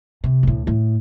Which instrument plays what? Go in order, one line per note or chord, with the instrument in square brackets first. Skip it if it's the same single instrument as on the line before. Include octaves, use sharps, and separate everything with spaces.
[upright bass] C3
D2 A2
A2